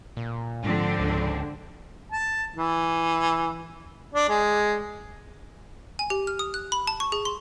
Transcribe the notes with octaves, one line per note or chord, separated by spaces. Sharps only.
A#2
G#2 D3 F3 C4 D4
C#2
A5
E3
D4
G#3
G#5
G4
F6
D#6
F#6
B5
A5
C#6
G#4
C6